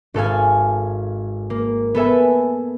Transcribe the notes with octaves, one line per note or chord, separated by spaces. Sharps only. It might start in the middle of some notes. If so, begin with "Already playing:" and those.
G#1 A4 F5 G#5
A#3
B3 A4 E5 G#5